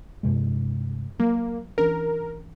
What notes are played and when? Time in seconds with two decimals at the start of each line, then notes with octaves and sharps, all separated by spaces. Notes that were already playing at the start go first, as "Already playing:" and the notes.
0.23 G2 C3 G#3
1.20 F#3 A#3
1.78 E3 C#4 D4 A#4